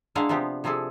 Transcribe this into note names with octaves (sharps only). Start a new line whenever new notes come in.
G#3 A#3 D4 E4 F5 F#5
C3 F3 B3 G4
C3 F3 E4 G#4 A4